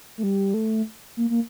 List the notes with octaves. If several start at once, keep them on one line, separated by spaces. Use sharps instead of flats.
A3
G3
A3
A#3
A#3